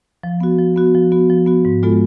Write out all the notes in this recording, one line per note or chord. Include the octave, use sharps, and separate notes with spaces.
F3
B3 F#4
F3
B3 F#4
F3
B3 F#4
F3
B3 F#4
G#2
G#3 B3 F4 A4